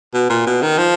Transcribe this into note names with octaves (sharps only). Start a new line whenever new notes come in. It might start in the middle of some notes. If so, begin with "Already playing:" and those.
B2
A#2
B2
D#3
F3